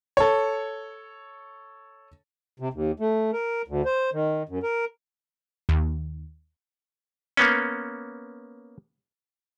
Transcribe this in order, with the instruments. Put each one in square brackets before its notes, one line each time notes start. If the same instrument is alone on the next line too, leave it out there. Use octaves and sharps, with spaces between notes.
[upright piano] A4 C#5
[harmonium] C3
D#2
A3
A#4
D2
C5
D#3
F#2
A#4
[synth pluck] D#2
[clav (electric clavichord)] A#3 B3 C#4